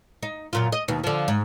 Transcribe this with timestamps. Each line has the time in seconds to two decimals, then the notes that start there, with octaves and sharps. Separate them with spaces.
0.23 D#4
0.53 F#2 A#2 F4
0.72 D#5
0.88 D#2 B2
1.04 D3 F3
1.28 G#2